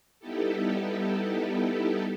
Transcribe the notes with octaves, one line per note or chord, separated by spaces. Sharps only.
G3 B3 D#4 E4 G4 A4